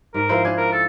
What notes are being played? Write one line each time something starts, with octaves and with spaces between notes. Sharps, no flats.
G#2 A#4
F3 E4 C5
D4 G#5
A#4
A4